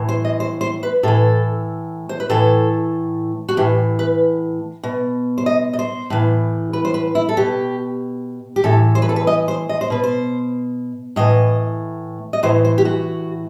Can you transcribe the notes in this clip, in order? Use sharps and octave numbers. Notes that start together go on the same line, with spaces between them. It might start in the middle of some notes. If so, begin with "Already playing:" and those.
Already playing: A2 E3
C5
D#5
C5
C5
B4
A2 E3 A4
C5
B4
A2 E3 A4
F#4
A2 E3 G4
B4
B2
C5
D#5
D#5
C5
A2 E3
B4
C5
B4
E4
A4
B2 G4
G4
A2 E3 A4
C5
B4
A4
B4
D#5
C5
D#5
C5
B2 B4
C5
A2 E3 D#5
D#5
A2 E3 C5
C5
G4
F#4